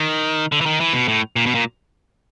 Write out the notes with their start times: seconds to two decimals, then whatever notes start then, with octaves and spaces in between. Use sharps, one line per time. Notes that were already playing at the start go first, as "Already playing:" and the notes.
Already playing: D#3
0.52 D3
0.61 E3
0.66 D#3
0.80 E3
0.93 B2
1.08 A2
1.36 A#2
1.46 B2
1.55 A#2